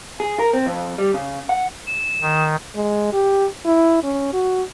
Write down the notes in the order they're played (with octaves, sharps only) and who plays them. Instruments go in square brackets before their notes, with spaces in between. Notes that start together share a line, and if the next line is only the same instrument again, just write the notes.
[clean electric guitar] G#4
A#4
C4
F2
G3
C#3
F#5
[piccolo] E7
[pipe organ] D#3
[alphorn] G#3
G4
E4
C#4
F#4